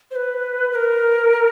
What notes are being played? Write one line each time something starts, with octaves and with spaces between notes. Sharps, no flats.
C5
B4
B4
A#4